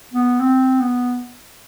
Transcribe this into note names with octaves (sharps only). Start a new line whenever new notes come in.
B3
C4
B3